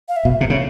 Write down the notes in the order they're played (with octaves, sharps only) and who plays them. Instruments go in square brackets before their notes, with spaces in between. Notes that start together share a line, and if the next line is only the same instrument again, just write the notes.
[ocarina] F5
E5
[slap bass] B2
C3
C#3